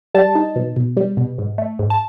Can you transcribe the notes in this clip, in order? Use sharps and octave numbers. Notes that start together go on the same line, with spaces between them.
G3 A5
D#4
B2
B2
G3
B2
G#2
A3
G#2
A5